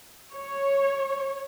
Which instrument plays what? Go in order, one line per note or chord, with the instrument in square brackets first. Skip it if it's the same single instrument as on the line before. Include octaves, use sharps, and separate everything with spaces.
[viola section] C#5